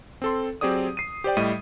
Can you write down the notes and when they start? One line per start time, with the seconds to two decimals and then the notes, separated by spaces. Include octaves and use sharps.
0.22 C4 A4 C6
0.61 F#3 C4 G4 G#4 D5 D#6
0.97 C7 D#7
1.24 G4 C5 D5 G5
1.37 A2 G3 D#5 D#7